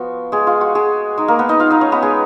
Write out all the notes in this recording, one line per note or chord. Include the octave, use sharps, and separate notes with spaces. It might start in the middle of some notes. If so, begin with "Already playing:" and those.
Already playing: F3 B3 F4 F#4
G#3 G#4
F4
F#4
G#3 G#4
G#3 D#4
A#3 A#4
B3 B4
D#4 D#5
F4 F5
D#4 D#5
C#4 C#5
B3 B4
G#3 G#4